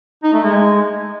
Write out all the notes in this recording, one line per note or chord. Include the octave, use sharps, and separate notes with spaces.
D#4
A3
G#3